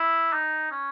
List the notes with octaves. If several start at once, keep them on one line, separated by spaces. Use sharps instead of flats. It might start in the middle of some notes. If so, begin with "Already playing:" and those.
Already playing: E4
D#4
C#4